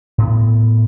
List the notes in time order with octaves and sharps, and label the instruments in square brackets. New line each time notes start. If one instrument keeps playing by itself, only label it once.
[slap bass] A2 B3